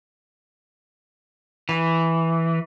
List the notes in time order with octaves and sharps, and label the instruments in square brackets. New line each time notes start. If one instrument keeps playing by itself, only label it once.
[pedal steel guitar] E3